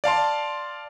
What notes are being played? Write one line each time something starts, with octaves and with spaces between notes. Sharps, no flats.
D5 F5 A5 C6